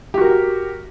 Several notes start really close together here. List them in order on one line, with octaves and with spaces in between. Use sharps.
G4 F#4 A#4